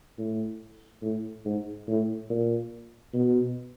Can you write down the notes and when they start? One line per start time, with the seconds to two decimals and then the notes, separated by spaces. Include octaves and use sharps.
0.18 A2
1.02 A2
1.45 G#2
1.88 A2
2.30 A#2
3.14 B2